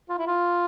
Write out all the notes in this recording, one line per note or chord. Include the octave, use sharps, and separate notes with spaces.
F4
E4
F4